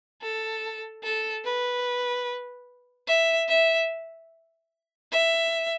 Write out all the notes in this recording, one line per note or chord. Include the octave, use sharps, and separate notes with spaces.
A4
A4
B4
E5
E5
E5